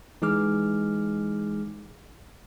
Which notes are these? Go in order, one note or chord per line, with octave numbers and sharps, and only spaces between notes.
E3 G#3 D#4 G#4 D6 F6